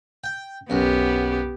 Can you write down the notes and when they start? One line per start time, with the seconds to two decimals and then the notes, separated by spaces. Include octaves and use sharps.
0.24 G5
0.70 B1 F#2 B3 G4